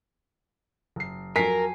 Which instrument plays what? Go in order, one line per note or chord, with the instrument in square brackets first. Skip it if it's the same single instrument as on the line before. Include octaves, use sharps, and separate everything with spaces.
[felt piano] F#1 C7
[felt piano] F2 F#3 [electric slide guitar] A#4 [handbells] G#5 [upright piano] B6 C7